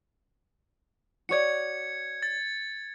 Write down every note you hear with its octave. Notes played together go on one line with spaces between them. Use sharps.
F#4 C#5 D5 G#6 C#7
A6